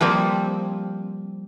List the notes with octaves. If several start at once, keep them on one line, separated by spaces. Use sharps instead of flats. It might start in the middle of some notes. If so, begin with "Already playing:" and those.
F3 G3 A#3 C4